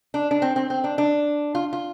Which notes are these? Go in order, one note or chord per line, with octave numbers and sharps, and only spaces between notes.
D4
D4
C4
C4
C4
D4
D4
F4
F4